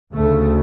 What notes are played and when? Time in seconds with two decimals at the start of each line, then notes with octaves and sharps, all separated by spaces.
0.13 D2 C#3 A3